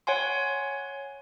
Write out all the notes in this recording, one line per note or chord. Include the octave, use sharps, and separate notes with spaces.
C#5 F#5 G#5 C6